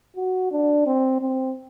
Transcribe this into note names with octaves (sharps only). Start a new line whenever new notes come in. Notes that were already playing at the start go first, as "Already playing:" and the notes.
F#4
D4
C4
C4